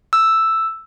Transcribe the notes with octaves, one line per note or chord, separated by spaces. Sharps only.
E6